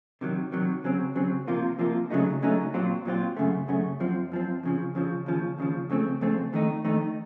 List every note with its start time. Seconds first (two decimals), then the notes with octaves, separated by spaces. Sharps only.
0.21 C3 D#3 F#3
0.52 C3 D#3 F#3
0.84 C#3 F#3 C4
1.16 C#3 F#3 C4
1.48 C3 F3 A#3 F4
1.79 C3 F3 A#3 F4
2.10 C#2 C#3 F#3 A3 D#4
2.42 C#2 C#3 F#3 A3 D#4
2.74 A#2 F#3 C4 F4
3.05 A#2 F#3 C4 F4
3.37 F#2 C#3 A3
3.68 F#2 C#3 A3
4.00 F#2 F3 C4
4.32 F#2 F3 C4
4.63 F2 C#3 F3
4.95 F2 C#3 F3
5.26 D#2 C#3 F3
5.58 D#2 C#3 F3
5.90 F2 C#3 A3 C4
6.21 F2 C#3 A3 C4
6.53 F2 D#3 A3 D#4
6.85 F2 D#3 A3 D#4